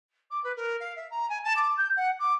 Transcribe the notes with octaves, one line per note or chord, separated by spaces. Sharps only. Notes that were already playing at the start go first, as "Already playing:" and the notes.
D6
B4
A#4
F5
E5
A#5
G#5
A5
D6
G6
F#5
D6